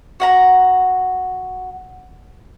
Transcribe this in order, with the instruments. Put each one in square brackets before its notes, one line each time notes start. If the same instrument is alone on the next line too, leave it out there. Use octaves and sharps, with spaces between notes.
[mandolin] F#4 F#5 A#5